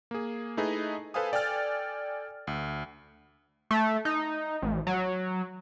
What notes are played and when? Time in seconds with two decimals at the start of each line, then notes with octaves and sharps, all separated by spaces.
0.11 A#3 G#4
0.57 A3 D#4 E4 G#4 B4 D#5
1.14 A4 B4 C5 F5 G#5 D#6
1.32 A4 D5 G5 G#5 F6 A6
2.47 D2
3.71 A3
4.05 D#4
4.62 A1
4.87 F#3